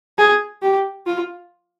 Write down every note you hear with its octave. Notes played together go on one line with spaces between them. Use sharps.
G#4
G4
F4